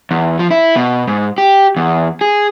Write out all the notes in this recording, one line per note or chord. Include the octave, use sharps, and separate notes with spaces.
E2
F3
E4
B2
G#2
G4
E2
G#4